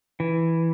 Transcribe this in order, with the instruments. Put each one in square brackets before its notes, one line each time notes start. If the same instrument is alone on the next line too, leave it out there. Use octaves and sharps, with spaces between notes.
[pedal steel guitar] E3